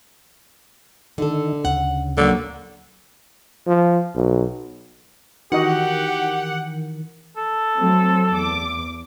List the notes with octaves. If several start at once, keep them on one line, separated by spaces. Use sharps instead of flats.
D3 D#3 A4
D2 C#3 F#5
D3 F#3 A#3
F3
B1
D#3 E3 F#4 G4 A#4 D#5 F#5
A4
F#3 A3 C4
E2 D6